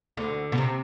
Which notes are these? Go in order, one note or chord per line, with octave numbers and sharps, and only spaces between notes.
D2 D3
B2
C3